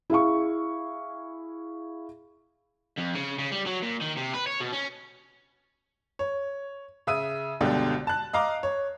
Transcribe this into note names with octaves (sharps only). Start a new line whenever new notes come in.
E4 G#4 F5 C#6
F2
C#3
C#3
G3
F#3
A#2
D#3
C3
B4
C#5
B2
C#4
C#5
C#3 E5 D#6 D#7
G1 C#2 B2 D3 G4
A5 F#6
D#5 F5 A#5 D6
C#5